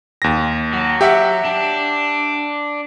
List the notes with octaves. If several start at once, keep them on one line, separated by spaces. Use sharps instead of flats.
D#2 A#6
F#3
G4 E5 F#5
D4